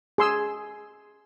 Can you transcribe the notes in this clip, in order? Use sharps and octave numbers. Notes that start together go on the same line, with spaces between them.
G#4 C6 E6